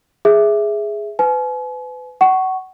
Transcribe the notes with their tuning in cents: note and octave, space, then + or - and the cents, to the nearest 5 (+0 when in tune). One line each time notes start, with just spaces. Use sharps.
G#4 +0 E5 +0
B4 +30 G#5 +45
F#5 +30 C#6 +0